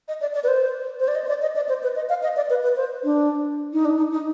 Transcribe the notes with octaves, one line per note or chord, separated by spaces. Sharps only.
D#5
D5
D5
B4
C5
C5
D5
D#5
C5
D5
D#5
D5
C5
B4
D#5
F5
D#5
D5
B4
B4
C5
D4
D#4
D4
D#4
D#4